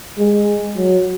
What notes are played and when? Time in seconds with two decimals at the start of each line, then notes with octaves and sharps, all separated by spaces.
0.18 G#3
0.77 F#3